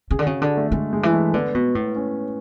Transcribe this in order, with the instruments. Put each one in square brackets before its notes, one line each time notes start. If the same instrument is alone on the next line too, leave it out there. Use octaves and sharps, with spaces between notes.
[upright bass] C#3 [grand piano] G#4
[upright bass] D3
[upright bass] C#3 [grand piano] F#4
[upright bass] D3 [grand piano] D4
[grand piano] A3
[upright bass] D3 [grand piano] G#3
[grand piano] G#3
[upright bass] E3
[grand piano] A3
[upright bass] D3 [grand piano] B3
[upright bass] B2
A2
[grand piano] C#4